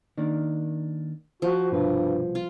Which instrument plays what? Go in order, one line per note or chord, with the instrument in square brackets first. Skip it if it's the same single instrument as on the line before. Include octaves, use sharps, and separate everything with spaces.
[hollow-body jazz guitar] D#3 A#3 D4
[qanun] F3 [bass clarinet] F#4
[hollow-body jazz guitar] C2 B2 B4 [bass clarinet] G2
[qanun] F4